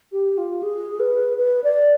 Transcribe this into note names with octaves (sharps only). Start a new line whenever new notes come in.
G4
F4
G#4
B4
B4
D5